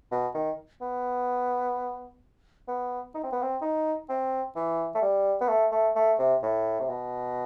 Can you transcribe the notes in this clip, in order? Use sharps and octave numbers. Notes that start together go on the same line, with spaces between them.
B2
D#3
B3
B3
D#4
C4
B3
C4
D#4
C4
E3
A3
G3
B3
A3
A3
A3
C3
A2
C3
B2